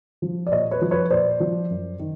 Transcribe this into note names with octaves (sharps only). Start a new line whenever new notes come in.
F3
D5
A#2 C#5 D#5
B4 C#5
F3
B4 C#5
A#2 C5 D5
F3
F#2
D#3